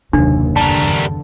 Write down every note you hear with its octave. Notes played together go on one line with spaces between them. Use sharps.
F#1 D#2 C3 D4
E2 G2 D3 G3 A#4 A5